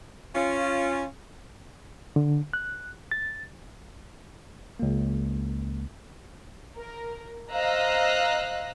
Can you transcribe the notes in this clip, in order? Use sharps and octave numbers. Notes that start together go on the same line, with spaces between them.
C#4 F4
D3
F#6
A6
C#2 A#3
A#4
C5 D#5 F5 A#5 E6 F#6